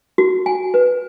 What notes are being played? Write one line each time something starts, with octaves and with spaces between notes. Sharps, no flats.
F#4
G#5
B4